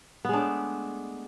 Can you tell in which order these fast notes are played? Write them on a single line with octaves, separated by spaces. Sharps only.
B3 G#3 D4 A3